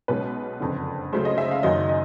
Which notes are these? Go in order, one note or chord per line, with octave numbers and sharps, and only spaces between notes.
B1 B2 G#3 C#4 B4
F#1 F2 D3
C#2 C#3 F#3 A3 C5
D#5
E5
F5
F#1 F#2 D#3 F#3 D#5
D#5